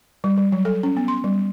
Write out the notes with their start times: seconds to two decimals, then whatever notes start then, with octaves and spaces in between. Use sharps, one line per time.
0.24 G3
0.37 G3
0.52 F#3
0.65 A4
0.83 C#4
0.97 B3
1.08 C6
1.24 G3